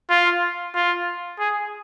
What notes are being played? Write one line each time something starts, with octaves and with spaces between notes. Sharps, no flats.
F4
F4
G#4